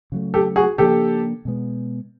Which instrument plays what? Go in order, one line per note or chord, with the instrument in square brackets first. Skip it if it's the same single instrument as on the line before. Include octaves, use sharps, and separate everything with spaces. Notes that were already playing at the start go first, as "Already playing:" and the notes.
[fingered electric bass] C#3 F#3 A3
[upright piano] G4 A4
F#4 G#4
[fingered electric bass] C#3 F3 A#3 D4 [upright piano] G4 A4
[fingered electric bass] B2 G#3 B3